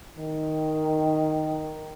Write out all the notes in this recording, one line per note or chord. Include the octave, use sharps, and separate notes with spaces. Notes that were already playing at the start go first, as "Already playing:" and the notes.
D#3